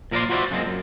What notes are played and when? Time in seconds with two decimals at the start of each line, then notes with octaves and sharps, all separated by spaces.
0.11 A#2 F3 A#4 B4 D5 C6
0.29 F4 F#4 B4 C5 D5 E5
0.51 F#2 A#2 F3 G#3 B3 C4
0.66 F#2